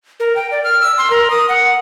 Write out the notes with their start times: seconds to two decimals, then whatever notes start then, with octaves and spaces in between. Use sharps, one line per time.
0.20 A#4
0.36 G5
0.51 D5
0.64 F6
0.81 E6
0.98 C6
1.10 A#4
1.30 D#6
1.49 F#5